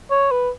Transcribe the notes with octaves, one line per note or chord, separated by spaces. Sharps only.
C#5
B4